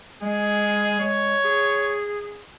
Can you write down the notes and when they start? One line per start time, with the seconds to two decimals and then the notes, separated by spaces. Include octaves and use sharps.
0.22 G#3 G#4
1.00 G#3 C#5
1.45 G#4